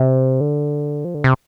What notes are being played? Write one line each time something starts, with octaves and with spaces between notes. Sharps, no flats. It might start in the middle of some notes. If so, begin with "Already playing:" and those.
Already playing: C3
D3
F3
D3
C3